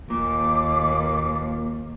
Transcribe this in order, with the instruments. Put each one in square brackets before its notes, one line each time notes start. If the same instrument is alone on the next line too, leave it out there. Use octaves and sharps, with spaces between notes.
[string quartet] D#2 [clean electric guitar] A#2 [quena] D6